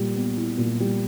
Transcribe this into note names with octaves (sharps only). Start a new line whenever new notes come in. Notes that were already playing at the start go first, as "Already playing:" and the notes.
Already playing: A#2 G3
B3
E4
A#2
G3